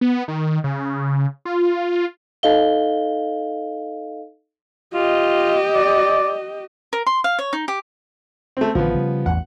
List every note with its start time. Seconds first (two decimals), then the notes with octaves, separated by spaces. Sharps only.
0.01 B3
0.28 D#3
0.64 C#3
1.45 F4
2.43 D#4 A4 D#5 F5 G7
4.94 F4 G4 D#5
5.75 D5
6.93 A#4
7.07 C6
7.24 F5
7.39 C#5
7.53 D#4
7.68 G4
8.57 A3 C4
8.75 A1 D3 F3 B3
8.94 C#3 G3
9.26 A1 E2 F#5